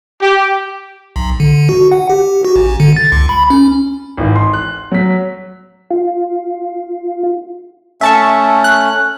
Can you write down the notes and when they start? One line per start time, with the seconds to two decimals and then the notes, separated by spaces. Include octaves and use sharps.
0.21 G4
1.16 B1
1.40 D3
1.69 F#4
1.92 F#5
2.10 G4
2.45 F#4
2.56 A1
2.80 D3
2.96 A6
3.12 C#2
3.29 B5
3.50 C#4
4.17 G#1 E3
4.36 C6
4.53 F#6
4.92 F#3 B6
5.90 F4
8.01 A3 C#4 E5 A5 C#6
8.64 F#6